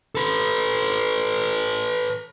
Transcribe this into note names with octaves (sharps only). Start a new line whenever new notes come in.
A4 B4